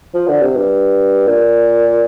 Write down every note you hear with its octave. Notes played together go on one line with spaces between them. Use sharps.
F3
D3
C3
G2
A#2